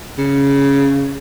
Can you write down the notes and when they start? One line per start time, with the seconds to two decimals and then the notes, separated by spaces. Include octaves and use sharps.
0.18 C#3